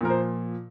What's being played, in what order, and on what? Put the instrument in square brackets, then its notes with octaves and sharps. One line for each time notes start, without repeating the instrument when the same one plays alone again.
[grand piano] A#2 F3 A#4
C5